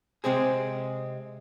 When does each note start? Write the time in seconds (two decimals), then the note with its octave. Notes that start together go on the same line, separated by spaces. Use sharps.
0.24 C3 G#3 C4 G#4